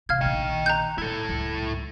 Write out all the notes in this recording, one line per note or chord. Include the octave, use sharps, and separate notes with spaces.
A1 C3 F5 F6 G#6
A#1 D#3 D#5 G5
A#5 F#6 G6
G3 E4 A4
C#2 F#2